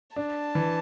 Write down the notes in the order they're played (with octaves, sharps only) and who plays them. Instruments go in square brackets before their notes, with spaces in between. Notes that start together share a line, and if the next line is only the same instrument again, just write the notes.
[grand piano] D4 [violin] A5
[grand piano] E3